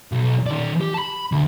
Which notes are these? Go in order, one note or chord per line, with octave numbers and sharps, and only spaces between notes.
B1
D#3 D5
G4
A5 B5
D2